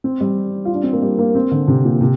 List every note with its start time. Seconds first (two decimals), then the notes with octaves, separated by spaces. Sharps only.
0.04 C4
0.21 G3
0.65 F4
0.74 D4
0.84 C4
0.93 A#3
1.02 G3
1.19 A#3
1.35 C4
1.51 D3
1.68 C3
1.84 A#2
2.01 C3